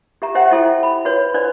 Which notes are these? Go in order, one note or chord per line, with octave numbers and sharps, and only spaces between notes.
G4 E5 A#5
G4 C5 E5 F#5 G5
E4 F#4 A4 C5 E5 G5
B5
F#4 B4 C#5
D4 B4 C5 D5